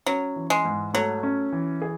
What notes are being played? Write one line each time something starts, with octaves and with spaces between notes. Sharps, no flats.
F#3 C#4
E3
G#3
G#2
F#3 A3
C#4
E3
G#4